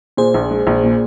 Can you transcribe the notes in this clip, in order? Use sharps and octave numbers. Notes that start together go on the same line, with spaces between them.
A#2 G#4 C5
A#1
G#3
A#1
A#2